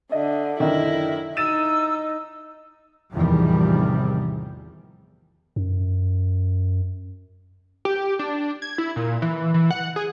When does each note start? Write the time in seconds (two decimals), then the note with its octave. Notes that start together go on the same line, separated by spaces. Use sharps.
0.12 D3 D#5 E5
0.60 F#1 D3 D#3 E4 D#5
1.37 D#4 E6 A6 D#7 E7
3.13 A1 E2 C3 D#3 F3 G3
5.56 F#2
7.85 G4
8.19 D4
8.62 G#6
8.78 E4
8.96 A#2
9.22 E3
9.54 E3
9.71 F#5
9.96 G#4